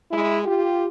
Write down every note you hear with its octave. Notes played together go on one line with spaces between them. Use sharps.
G#3 E4
F4 G4